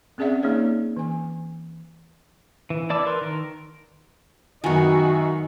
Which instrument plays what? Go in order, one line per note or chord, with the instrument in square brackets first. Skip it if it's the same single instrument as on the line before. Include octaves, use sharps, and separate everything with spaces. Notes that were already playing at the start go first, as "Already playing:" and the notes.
[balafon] C4 C#4 G#4 D5 E5 F#5
A#3 D#4 G#4 C#5 D5
E3 G#5
[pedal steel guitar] E3
E4 D5 A5 D6 E6
A#4 B4 C6
D#3 A#4
[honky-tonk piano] F#2 G#5 [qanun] D#3 B3 [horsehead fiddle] F#4 D#5